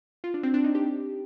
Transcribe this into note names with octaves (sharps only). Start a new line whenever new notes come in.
F4
D4
C4
D4
D#4
G4